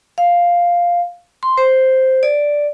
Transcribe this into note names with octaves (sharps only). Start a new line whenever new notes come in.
F5
C6
C5
D5